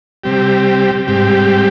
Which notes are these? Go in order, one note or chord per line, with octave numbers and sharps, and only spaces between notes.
C3 G3 C4 G4
G#2 G3 C4 G4